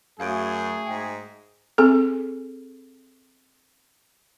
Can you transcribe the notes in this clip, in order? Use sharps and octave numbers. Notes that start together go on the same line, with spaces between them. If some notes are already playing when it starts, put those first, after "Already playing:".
F#2 A3 F#4 G#4 C#5 F5
G#2 G5
C4 G#4 A4